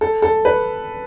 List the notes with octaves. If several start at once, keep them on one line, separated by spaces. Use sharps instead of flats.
A4
A4
B4